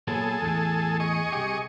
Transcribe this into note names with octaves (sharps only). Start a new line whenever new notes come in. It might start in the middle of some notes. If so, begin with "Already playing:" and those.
A#2 F#3 B3 G#4 A4
E2 A2
G#4 D#5 C#6
C2 G4